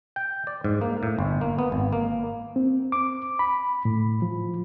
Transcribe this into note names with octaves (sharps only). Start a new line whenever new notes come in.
G5
D5
G#2
A#3
A2
G1
A#3
B3
G#1
A#3
C4
D6
B5
A2
F3